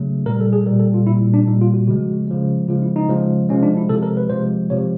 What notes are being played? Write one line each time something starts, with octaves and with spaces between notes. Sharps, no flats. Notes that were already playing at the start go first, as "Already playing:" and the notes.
Already playing: C#3 F#3 A3
A#2 G3 A#4
A4
G#4
A#2 G3 A#4
A4
F4
A#2 G3 E4
D4
A#2 G3 D#4
F4
F#4
C#3 F3 G#3 F#4
C#3 F3 G#3
C#3 F3 G#3 F4
E4
D#4
C#3 F3 G#3
C3 F3 G#3 C#4
D4
E4
C3 F3 G#3 A4
A#4
B4
C3 F3 G#3 C5
C3 F3 G#3 C#5